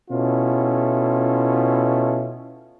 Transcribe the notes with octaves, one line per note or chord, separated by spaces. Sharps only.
B2 C#4 E4 F4 A4